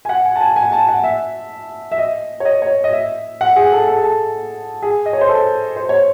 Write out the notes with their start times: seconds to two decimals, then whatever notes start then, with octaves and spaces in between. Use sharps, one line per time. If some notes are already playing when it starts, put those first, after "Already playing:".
0.05 G#5
0.09 F#5
0.25 G#5
0.36 A5
0.41 G#5
0.56 G#5
0.72 A5
0.88 F#5
1.04 E5
1.92 E5
1.98 D#5
2.40 C#5
2.45 D#5
2.62 C#5
2.84 D#5
2.93 E5
3.41 F#5
3.56 G#4
3.72 A4
3.88 A4
3.96 G#4
4.04 A4
4.83 G#4
5.06 D#5
5.13 C#5
5.21 C5
5.29 A4
5.76 C5
5.89 C#5